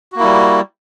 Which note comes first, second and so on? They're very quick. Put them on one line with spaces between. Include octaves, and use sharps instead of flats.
F#4 A#3 E4 G3